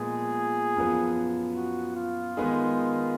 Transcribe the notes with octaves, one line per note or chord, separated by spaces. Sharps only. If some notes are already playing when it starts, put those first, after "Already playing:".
Already playing: A#2 F3 G#3 B3 G#4
F#2 F3 B3
F#4
F4
D#3 G#3 B3 D#4 G#4